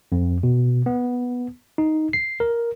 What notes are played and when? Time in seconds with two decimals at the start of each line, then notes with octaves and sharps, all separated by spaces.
0.12 F2
0.43 B2
0.86 B3
1.78 D#4
2.13 C7
2.40 A#4